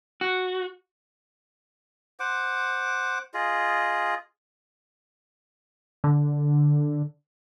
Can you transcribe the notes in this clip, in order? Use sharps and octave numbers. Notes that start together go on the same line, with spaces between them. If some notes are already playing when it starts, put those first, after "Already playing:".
F#4
C5 F#5 D6
F4 G#4 D#5
D3